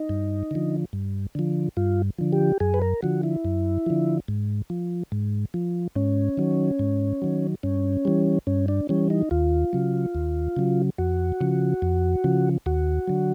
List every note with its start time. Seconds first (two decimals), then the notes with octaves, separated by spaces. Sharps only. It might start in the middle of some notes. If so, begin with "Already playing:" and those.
Already playing: D#4
0.09 G2
0.51 D3 F3
0.93 G2
1.35 D3 F3
1.77 G2 F4
2.18 D3 F3
2.33 G4
2.60 F#2 G#4
2.74 B4
2.82 A#4
3.02 D3 F3 F#4
3.23 E4
3.45 F#2
3.86 D3 F3
4.28 G#2
4.70 F3
5.12 G#2
5.54 F3
5.95 G#2 C#4
6.37 D#3 F#3
6.79 G#2
7.22 D#3 F#3
7.63 G2 C#4
8.05 E3 G3
8.47 G2 C#4
8.68 D4
8.89 E3 G3 C#4
9.10 D#4
9.31 D#2 F4
9.73 C#3 F#3
10.15 D#2
10.56 C#3 F#3
10.98 F2 F#4
11.41 C#3 F3
11.82 F2
12.24 C#3 F3
12.66 D#2 F#4
13.08 D3 F#3